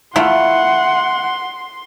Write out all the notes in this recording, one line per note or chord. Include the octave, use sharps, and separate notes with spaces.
A3 E4 F4 F#5 C6